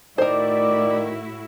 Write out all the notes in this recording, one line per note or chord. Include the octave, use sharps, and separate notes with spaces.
A2 D#3 E4 F#4 A#4 C5 D5